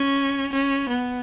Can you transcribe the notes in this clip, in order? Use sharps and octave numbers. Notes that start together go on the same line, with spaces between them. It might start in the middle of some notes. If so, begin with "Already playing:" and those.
Already playing: C#4
C#4
B3